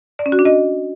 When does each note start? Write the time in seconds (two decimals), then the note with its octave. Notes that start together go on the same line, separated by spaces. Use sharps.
0.19 D5
0.26 C#4
0.32 F#4
0.39 D4
0.45 D#5